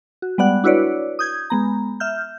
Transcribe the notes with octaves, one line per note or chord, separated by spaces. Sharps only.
F#4
G3 G#3 B3 D5 F#5 F#6
D4 E4 F#4 B4 C#5 D5
D#6 G6 G#6
G#3 B3 A#5
E5 F6 G6